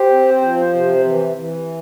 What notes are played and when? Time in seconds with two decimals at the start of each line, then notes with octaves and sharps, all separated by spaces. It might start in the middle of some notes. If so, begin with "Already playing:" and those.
Already playing: G4 C5
0.10 C4
0.42 F3
0.73 C3
1.05 E3
1.36 E3